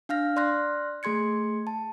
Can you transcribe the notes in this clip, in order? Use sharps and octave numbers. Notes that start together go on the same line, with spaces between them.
D4 F5 F6 A#6
D5 C6 F6 F#6 A#6
A3 G#4 C6 G#6 C#7
A5